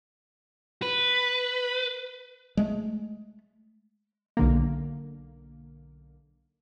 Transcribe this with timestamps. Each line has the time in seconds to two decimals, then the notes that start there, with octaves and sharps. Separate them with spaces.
0.82 B4
2.57 G#3 A3
4.37 B1 D3 A#3